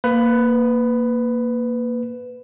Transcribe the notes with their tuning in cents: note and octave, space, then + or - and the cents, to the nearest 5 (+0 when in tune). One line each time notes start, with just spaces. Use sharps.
A#3 +0 B4 +15